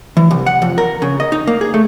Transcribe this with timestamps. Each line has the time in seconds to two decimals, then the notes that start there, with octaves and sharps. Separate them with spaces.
0.17 E3
0.31 C2
0.46 F#5
0.62 F2
0.78 A#4
1.02 C#3
1.20 D#5
1.32 D#4
1.47 A#3
1.61 G#4
1.74 A3